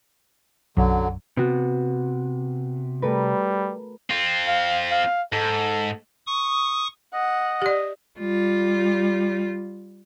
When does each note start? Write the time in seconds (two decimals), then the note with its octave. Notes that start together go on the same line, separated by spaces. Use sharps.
0.77 B1 F#2 D3 F#3
1.37 C3 B3 F#4
3.02 G3 A3 A#4 B4
4.10 C4 F4
4.48 F5
4.91 F5
5.33 G#2 A4
6.27 C#6 D#6
7.14 D#5 F#5
7.62 G4 D5
8.19 G3 F4